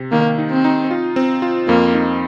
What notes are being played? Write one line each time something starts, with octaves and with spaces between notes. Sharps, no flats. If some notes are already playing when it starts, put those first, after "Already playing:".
Already playing: C3
D#3 A#3
D#4
C4
D#4
F4
C4
F4
F2 A#3
D#4